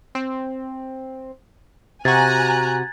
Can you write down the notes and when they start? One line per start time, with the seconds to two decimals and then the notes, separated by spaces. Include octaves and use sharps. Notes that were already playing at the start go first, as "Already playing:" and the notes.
0.15 C4
2.05 C3 F#4 G#5 A#5 F#6 G#6 A6